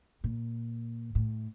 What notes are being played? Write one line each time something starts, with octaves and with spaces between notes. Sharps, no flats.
A#2
A2